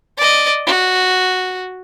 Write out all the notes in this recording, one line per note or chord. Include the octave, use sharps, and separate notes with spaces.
D5 D#5
F#4